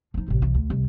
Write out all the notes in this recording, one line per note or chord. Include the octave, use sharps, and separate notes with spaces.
F3 D#4
A1 C3
B1 E3
D2
C2